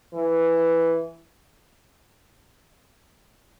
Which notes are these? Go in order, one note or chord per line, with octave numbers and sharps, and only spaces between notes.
E3